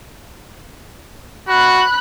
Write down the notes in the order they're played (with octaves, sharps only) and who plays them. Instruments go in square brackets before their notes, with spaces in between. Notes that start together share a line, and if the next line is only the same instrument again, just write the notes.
[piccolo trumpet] F#4 [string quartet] B5 F#6